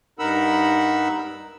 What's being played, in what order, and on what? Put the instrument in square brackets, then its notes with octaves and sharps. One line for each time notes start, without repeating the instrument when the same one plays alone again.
[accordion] G2 D#4 A#4 F#5 B5 E6